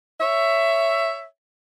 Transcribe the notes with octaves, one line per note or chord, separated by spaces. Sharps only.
C#5 E5